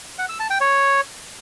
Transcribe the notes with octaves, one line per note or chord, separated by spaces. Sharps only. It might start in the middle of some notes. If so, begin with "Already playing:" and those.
F#5
E6
A5
G5
C#5